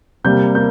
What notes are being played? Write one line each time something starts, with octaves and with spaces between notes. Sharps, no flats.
C3 G3 A#3 G6
A#3 G6